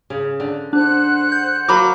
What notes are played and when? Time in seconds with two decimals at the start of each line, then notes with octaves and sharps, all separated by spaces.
0.10 C#3
0.40 D3
0.73 D4 C5 F#5 F#6
1.32 G6
1.68 F#3 A#3 A#4 B5 D6